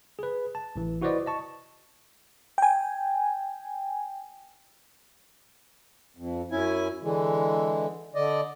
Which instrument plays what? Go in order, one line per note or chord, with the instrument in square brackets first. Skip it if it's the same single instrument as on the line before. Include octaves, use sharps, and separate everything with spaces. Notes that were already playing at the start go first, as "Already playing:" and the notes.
[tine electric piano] G#4 B4
A5
A1 E3
E4 F#4 B4 C5 D5 D#5
D#5 A5 C#6
[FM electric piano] G5 G#5
[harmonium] F2
F#2 C#4 E4 G#5
D3 E3 G#3
D3 D5 D#5